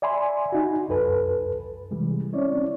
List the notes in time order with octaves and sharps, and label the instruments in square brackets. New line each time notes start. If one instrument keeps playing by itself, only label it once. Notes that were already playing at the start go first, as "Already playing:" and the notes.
[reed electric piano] D5 E5 G#5 B5 C6
D#4 F#4 G#5
C2 F#2 A4 B4
C3 E3 G3 G#3
C4 C#4 E4 C#5 D5